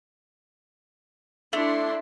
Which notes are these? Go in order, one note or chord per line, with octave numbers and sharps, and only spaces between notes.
A3 D4 E4 C6